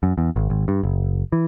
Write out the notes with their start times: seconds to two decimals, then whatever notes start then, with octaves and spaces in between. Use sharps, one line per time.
0.03 F#2
0.18 E2
0.36 G#1
0.50 G#1
0.68 G2
0.83 F#1
1.32 E3